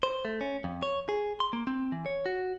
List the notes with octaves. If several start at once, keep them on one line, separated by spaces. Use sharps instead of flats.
C5
A3
C#4
F2
C#5
G#4
C6
A#3
C4
E3
C#5
F#4